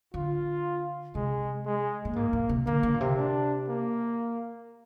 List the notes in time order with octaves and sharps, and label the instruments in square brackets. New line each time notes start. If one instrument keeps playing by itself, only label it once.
[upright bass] D3 [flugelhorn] F4
[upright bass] C3 [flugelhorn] G#3
[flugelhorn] G#3
[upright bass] A#2
[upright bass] G#2 [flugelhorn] A#3
[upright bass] A#2
C3
[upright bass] D3 [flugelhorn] A#3
[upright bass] D3
A#2
C3
[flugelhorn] D4
A#3